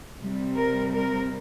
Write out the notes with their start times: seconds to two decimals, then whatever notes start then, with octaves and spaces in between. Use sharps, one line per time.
0.19 C3 G3 C4
0.57 A#4
0.94 A#4